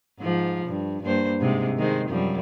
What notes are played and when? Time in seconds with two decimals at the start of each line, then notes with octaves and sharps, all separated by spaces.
0.20 G#2 F3
0.67 G2
1.02 G2 A#3 C5
1.40 G#2 C3 G#3
1.78 D#3 G#3 C5
2.09 F#2 F3 G3